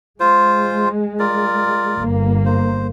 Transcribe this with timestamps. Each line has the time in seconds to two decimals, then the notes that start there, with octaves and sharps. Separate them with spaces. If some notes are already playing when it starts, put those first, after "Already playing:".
0.20 G#3 F4 C5
1.19 F4 A#4 D5
1.97 G1 A#3
2.45 C5